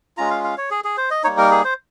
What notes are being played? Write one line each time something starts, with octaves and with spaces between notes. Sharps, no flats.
G#3 C#4 F4 A#5
F5
F5
C#5
G#4
G#4
C5
D#5
G3 A#3 D#4 C#5
A#4
G#4
C5